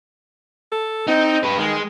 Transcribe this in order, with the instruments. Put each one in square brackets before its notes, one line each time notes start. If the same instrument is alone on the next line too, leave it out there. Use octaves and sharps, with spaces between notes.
[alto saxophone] A4
[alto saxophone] C4 [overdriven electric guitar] D#4
[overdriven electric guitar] G4 B4
[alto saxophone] D#3 [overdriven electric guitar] G#3